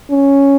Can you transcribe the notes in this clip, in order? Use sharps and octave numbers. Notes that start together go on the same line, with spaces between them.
C#4